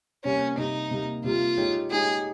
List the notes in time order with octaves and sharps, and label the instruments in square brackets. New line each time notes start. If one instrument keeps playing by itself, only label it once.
[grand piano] C3 G3 A#3 [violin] C#4
[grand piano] C3 G3 A#3 [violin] D#4
[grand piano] C3 G3 A#3
[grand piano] C3 G3 A#3 [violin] F4
[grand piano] G#3 D#4 G4 C#5
[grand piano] G#3 D#4 G4 C#5 [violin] G#4